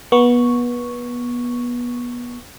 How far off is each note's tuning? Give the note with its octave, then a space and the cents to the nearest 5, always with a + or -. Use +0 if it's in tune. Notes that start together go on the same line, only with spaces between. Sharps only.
B3 -25 C#6 +0